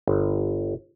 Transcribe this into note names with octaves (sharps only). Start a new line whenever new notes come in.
G1